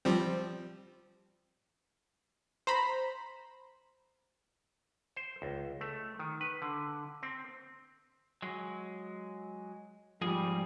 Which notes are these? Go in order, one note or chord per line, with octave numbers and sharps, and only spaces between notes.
F3 G3 C4
C5 A#5 B5
C5
C#2
A3
D#3
B4
D3
C4
F#3 G#3
G#2 F3 G3 C4 G#4